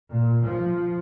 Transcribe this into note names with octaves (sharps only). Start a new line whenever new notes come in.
A#2
F3